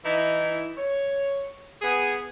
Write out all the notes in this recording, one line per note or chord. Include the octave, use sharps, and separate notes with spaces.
E3 D#4 E4
C#5
B3 G#4